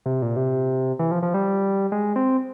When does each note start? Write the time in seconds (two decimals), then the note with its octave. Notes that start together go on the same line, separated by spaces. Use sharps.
0.06 C3
0.22 A#2
0.36 C3
0.99 E3
1.11 F3
1.23 F3
1.34 G3
1.92 G#3
2.16 C4